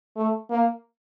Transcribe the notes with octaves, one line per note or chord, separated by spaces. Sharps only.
A3
A#3